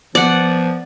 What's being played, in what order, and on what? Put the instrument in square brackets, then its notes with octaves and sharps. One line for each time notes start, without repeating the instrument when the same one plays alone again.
[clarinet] F3 [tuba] B3 [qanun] D5 F#5